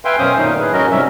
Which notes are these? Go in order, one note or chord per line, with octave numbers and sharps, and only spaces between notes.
B4 E5 F5 G5 G#5 C6
F#2 B2 C#4 C5 F5 D#6
A#2 D#3 F#3 A3 D#4
A2 G#4 B4
F#3 C#4 F#4 A#4 D#5
G#2 C3 F#3 G3 C#4 E5